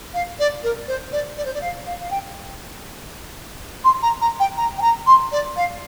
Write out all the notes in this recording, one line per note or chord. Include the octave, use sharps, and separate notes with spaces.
F5
D5
A#4
C5
D5
D5
C5
D5
F5
F5
F5
G5
C6
A#5
A#5
G5
A#5
G5
A#5
C6
D5
F5